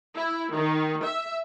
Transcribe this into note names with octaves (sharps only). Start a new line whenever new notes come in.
E4
D#3
E5